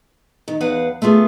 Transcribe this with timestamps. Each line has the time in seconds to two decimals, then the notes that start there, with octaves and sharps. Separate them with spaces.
0.48 D#3
0.60 E2 B4 F5 F#5
1.02 A3 B3 F4 G#4